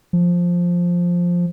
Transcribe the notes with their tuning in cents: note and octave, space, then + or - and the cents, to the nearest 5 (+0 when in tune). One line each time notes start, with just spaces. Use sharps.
F3 +5